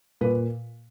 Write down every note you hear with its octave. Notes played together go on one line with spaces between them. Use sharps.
A#2 B4